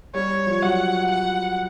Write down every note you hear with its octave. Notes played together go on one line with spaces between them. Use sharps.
G3 C#5
F3
F#3 F#5
F#5